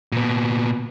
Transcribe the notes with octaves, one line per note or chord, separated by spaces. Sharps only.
A#2 B3